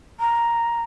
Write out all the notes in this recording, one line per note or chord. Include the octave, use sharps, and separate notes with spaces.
A#5